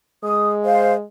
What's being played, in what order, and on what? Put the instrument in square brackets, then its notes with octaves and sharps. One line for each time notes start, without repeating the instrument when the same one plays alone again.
[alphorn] G#3 [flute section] D#6
[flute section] C5 F5